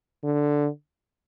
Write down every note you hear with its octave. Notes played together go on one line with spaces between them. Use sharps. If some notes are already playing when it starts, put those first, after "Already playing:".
D3